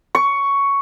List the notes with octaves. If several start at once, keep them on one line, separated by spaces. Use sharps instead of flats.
C#6